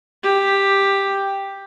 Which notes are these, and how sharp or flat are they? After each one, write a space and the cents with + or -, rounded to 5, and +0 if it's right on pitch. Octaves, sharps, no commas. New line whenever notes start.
G4 +5